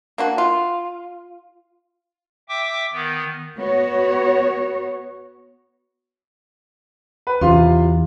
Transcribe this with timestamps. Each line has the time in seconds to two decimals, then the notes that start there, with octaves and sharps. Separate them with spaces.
0.18 A#3 D4 F#4
0.38 F4
2.49 E5 G5 D6
2.93 D#3 B3
3.56 B3 F#4 C#5
7.27 B4
7.41 E2 C3 E3 F4 C6